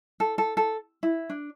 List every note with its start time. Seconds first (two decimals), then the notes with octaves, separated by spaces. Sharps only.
0.20 A4
0.38 A4
0.57 A4
1.03 E4
1.30 D4